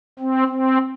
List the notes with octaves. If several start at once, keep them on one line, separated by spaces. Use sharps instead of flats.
C4
C4